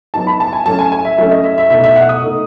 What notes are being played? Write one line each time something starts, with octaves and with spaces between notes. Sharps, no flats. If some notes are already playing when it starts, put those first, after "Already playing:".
F#3 B3 D#4 A5
B5
A5
G#5
F#3 A3 C#4 A5
G#5
G#5
E5
F#3 A3 C#4 E5
D#5
E5
E5
B2 A3 D#4 E5
E5
F#5
D#6
B2 A3 D#4